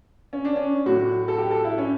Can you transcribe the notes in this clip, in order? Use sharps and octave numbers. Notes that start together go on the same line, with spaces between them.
C#4
D4
C#4
A2 F#3 F#4
A4
G4
A4
E4
C#4